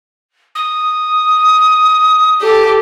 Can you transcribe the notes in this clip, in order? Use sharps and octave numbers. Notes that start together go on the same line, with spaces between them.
D#6
G4 A4